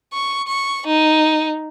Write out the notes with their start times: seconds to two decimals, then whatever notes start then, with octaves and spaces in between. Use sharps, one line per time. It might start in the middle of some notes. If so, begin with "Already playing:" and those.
0.13 C#6
0.48 C#6
0.87 D#4